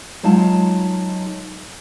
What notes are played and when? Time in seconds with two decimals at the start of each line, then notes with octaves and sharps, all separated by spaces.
0.23 F#3 G#3 D#4 F4 A5